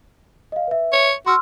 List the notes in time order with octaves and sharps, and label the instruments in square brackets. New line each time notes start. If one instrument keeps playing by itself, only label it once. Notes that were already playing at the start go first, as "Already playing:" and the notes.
[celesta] D#5 F5
B4 E5
[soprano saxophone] C#5
[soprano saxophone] F#4 [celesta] C6 E6 F6